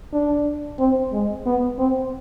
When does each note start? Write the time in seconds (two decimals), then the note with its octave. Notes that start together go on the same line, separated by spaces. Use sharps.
0.13 D4
0.79 C4
1.12 G#3
1.46 B3
1.78 C4